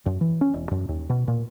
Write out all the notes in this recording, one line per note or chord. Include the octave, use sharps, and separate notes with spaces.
F#2
E3
C#4
E1
F#2
D#2
B2
A#2